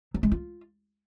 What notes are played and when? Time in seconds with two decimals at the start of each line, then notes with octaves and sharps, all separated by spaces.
0.14 F#3
0.23 G#3
0.32 F4